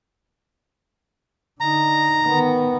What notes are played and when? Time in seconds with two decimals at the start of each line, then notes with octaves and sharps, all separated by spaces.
1.60 D3 D#4 A#5
2.22 D#3 B3